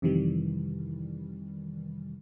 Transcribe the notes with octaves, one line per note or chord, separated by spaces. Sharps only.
F2 C3 D#3 E3 G3